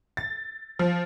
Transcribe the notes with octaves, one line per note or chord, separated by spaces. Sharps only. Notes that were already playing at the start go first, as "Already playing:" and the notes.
A6
F3